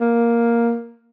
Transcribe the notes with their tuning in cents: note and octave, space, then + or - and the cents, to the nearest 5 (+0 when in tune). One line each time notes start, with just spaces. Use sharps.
A#3 +5